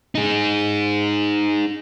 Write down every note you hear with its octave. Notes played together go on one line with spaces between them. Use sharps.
D#4 G#4